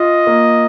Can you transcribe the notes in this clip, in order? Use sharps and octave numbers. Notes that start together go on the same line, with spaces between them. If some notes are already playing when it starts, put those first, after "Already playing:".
Already playing: F4 D#5
A#3